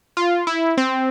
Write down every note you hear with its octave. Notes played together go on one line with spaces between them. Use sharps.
F4
E4
C4